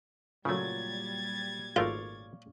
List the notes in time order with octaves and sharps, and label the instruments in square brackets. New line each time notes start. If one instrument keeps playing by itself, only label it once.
[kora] A#2 F#3 [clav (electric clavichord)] C#3 A3 [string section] G3 G#6 A6
[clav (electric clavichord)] G#1 A3 A#4 [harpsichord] F4 [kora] C#5 D5 F5